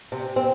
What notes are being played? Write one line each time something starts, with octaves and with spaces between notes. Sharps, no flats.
C3
C4